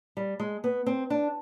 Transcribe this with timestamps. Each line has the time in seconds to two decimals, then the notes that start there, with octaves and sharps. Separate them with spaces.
0.17 G3
0.40 G#3
0.64 B3
0.86 C4
1.10 D4